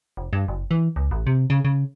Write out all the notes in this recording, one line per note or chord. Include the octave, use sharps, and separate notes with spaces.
F1
G2
F#1
E3
C#2
A1
C3
C#3
C#3